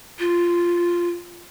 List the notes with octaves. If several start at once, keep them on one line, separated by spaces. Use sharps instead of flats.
F4